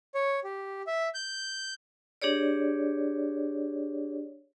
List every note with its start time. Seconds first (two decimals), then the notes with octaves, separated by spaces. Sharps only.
0.15 C#5
0.44 G4
0.87 E5
1.14 G6
2.22 D4 G4 G#4 C#5 D5